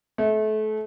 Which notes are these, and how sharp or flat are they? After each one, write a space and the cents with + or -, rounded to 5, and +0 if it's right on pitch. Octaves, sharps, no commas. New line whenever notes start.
A3 -30